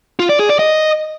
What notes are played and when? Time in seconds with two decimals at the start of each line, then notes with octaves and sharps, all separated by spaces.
0.19 F4
0.29 D5
0.39 G#4
0.49 D5
0.59 D#5